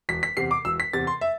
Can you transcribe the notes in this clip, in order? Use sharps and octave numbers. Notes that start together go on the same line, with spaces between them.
E1 B6
B6
E2 C3 C7
D6
E1 E6
B6
E2 C3 A6
C6
E5